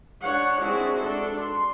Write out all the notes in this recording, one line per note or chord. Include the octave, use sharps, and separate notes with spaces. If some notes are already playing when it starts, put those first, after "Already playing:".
D4 C#5 F#5
G#3 C4 D4 E4 F#4 G#4
D4 A4
C6